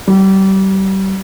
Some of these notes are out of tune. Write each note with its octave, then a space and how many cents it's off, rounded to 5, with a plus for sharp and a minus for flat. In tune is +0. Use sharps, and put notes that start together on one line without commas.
G3 -30